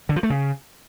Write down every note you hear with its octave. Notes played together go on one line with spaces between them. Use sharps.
D3
F3
A3
C#3